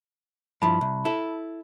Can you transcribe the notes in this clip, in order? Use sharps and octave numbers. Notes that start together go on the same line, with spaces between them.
G2 F3 E4 A5 B5
C2
E4 A4